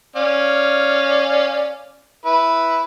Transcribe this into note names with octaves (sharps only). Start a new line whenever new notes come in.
C#4 D5 F5
E4 B4